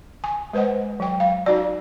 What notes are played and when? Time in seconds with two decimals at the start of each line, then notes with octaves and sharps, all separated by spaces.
0.24 G#5
0.53 G#3 B4 C5 D#5 F#5
1.00 F#3 G5
1.20 F5
1.46 D#4 F#4 D5